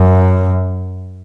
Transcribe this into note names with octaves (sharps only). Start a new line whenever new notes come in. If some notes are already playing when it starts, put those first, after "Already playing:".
Already playing: F#2